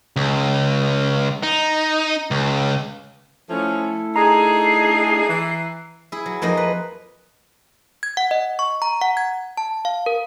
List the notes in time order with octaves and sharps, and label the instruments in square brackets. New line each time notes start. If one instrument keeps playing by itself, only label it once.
[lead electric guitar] C#2
D#4
C#2
[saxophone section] F3 C#4 [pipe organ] A3 E4 A4
[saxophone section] D4 D#4 G#4 [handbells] A#5 [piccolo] C7
[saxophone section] E3
[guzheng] E4 G#4
F#3
F2 F3 A#3 D#4 D#5
B4
[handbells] G#6
F#5
D#5
C#6
A#5
F#5
G#6
A5
F5
A#4